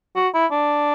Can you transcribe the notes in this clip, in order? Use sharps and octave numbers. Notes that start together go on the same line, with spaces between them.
F#4
E4
D4